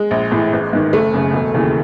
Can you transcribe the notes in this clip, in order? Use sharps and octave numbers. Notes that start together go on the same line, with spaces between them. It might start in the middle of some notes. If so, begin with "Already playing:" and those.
Already playing: G#3
A#1
A2 E3
A1
G#2 D#3
F#1 A3
F#2 C#3
E1
D#2 C#3 E3